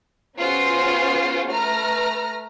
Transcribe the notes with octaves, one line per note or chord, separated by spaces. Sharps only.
B3 C#4 F4 F#4 G#4 C5
A3 B4 A#5 F6 A#6